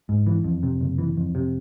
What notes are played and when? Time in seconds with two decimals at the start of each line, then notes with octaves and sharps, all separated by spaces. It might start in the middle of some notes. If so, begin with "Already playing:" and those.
0.09 G#2
0.26 E3
0.44 F2
0.63 C3
0.81 F#1
0.98 E3
1.17 F2
1.35 C3